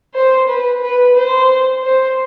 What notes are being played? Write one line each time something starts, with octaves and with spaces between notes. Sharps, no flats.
C5
B4
B4
C5
C5